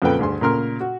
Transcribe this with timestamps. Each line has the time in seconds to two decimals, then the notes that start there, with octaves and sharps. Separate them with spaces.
0.02 F2 A#2 C#3 A4 B4 G5
0.19 D2 G2 G#4 C6
0.41 A#2 C#3 A#4 C6 F6
0.80 F#4